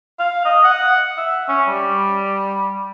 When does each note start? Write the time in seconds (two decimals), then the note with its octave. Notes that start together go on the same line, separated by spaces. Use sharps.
0.20 F5
0.45 D#5
0.64 F#5
1.17 E5
1.48 C#4
1.68 G3